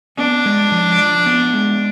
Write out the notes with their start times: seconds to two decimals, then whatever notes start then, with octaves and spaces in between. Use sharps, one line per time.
0.18 B3 D4
0.46 G#3
0.71 F3
0.99 F3
1.26 B3
1.54 G#3